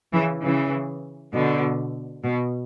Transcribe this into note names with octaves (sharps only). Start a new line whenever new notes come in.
C#3 E3
C#3 E3
B2 D3
B2